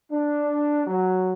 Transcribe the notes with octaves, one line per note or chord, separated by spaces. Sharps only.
D4
F#3